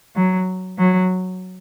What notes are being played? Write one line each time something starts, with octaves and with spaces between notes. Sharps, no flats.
F#3
F#3